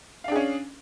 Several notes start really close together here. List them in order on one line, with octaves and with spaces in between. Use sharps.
F5 D4 G#4 C#4